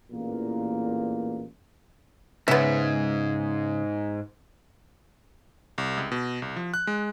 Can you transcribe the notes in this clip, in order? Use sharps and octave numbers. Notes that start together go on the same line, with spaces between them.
A1 E2 A#2 A#3
G#2 C#3 B3 E5
C2
C#2
B2
C2
F3
F#6
G#3